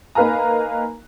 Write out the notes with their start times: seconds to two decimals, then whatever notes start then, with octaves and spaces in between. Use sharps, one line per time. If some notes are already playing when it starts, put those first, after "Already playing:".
0.15 A#3 D#4 B4 F5 G#5 A#5